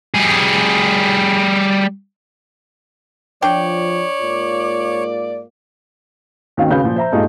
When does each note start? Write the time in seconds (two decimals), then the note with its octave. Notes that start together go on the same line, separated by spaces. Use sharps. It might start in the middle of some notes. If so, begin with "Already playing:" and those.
0.14 G3 G#4
3.42 F3 D4 C#5 D5 G5
4.21 G#2 A#3 F4
6.57 D#2 D#3 C4 C#4 F#4 F5
6.70 C#3 C#4 F#4 B4 F5 G6
6.83 A#2 F3
6.96 C5 E5 A#5
7.12 G2 A#2 G#3 A3 D#4 F4